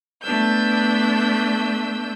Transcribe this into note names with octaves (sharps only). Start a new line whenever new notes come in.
A3 B3 D4 E6 G6